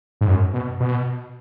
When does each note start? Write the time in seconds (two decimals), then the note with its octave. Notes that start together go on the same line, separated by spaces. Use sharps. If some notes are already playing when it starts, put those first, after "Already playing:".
0.21 G#2
0.28 F#2
0.54 B2
0.80 B2